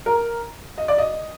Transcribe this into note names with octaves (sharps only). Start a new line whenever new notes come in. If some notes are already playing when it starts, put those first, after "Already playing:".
A#4
D#5
D5
D#5